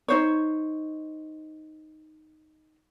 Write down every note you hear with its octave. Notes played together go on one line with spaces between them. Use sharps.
D#4 C5 C#5